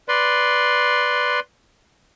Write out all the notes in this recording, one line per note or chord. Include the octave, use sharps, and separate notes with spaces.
B4 D5 C6